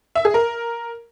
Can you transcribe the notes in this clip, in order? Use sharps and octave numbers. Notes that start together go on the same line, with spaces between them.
E5
G#4
A#4